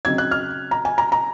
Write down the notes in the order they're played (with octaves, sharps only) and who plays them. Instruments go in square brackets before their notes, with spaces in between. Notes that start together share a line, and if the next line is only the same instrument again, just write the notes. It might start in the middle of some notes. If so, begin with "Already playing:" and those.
[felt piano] C#3 F#3 C4 D#4 G#6
F#6
F6
A#5
G#5
A#5
A#5